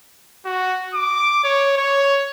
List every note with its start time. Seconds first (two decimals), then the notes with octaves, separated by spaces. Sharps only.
0.46 F#4
0.94 D6
1.44 C#5
1.77 C#5